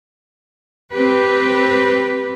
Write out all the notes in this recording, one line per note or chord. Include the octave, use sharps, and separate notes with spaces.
C4 G4 B4